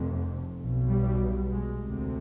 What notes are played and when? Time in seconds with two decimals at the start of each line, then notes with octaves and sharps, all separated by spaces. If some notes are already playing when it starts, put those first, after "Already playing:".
Already playing: F1 F2 C3
0.56 B1 B2
0.87 G3
1.51 G#3
1.84 D2 C3